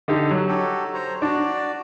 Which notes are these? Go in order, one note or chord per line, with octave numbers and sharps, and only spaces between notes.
D3 D#4 G4
F#3
F#4 G4 A4
C5 C#5 A#5
D4 F#4 D5